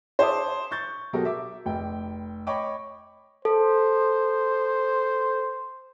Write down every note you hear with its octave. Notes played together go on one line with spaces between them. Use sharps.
C5 C#5 E5 A5 D6 D#6
C#6 G6 A6
B2 F#3 G4 A4 A#4
E5 D6
F1 G5
C#5 D#5 G5 B5 C#6 D6
A4 C5